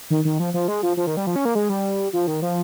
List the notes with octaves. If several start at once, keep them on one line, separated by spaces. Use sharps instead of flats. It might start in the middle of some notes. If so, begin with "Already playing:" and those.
D#3
D#3
F3
F3
G#3
F3
F3
D#3
G3
F3
C#4
A#3
G#3
G3
F3
D#3
F3